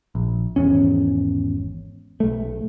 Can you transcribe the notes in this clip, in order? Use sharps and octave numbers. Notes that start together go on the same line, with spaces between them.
A#1
G#1 E2 C#4
B1 A3